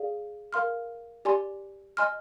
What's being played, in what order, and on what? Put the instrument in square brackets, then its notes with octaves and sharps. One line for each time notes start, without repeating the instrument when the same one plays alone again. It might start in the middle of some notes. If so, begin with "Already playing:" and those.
Already playing: [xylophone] G#4 D5 F5
A#4 F5 C6 F6
G4 D5 G#5 C6
D#5 G#5 C6 F6